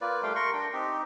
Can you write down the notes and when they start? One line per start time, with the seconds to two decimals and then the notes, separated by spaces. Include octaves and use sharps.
0.01 A#3 F4 B4 D5
0.23 G3 A3 F5 G5
0.35 A#4 C6 C#6
0.53 D4 G5
0.73 C4 D#4 G4